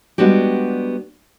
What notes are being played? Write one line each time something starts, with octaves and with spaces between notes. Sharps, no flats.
G3 G#3 B3 D4 F#4 G4